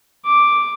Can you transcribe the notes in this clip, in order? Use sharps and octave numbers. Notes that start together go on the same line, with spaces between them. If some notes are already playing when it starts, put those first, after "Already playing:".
D6